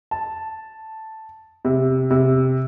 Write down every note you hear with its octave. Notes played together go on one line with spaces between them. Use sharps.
A5
C3
C3